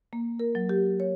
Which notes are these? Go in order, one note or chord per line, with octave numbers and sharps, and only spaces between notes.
A#3
A#4
F#3
G4
C#5